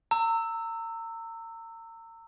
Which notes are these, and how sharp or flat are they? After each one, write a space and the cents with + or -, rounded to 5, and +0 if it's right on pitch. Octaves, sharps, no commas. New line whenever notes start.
A#5 -35 E6 +0